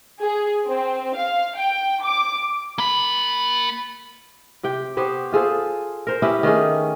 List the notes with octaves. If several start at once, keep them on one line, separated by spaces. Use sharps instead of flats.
G#4
C4
F5
G5
D6
A#3 B5
C3 G4 G5
B3 G4 C5 C#5
F4 G#4 A4 C5
A#4 C5
B3 C#4 E4 G4
D#3 A3 C#4 G#4